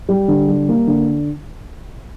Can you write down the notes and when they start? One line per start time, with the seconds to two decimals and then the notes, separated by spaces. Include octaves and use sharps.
0.09 G3
0.28 D3
0.49 G3
0.69 A#3
0.87 D3